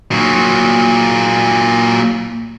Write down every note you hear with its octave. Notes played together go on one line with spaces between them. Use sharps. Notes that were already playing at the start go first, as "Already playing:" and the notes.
A#2 F#3